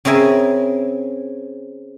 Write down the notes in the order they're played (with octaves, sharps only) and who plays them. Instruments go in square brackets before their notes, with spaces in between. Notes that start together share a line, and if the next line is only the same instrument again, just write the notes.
[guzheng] C#3 C4 A#4 E5 G#5